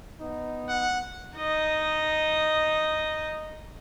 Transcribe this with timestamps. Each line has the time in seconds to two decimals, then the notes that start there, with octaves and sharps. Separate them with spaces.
0.20 B3 D#4
0.69 F#5
1.38 D#4 D#5